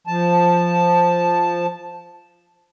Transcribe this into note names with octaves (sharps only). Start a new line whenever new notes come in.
F3 A5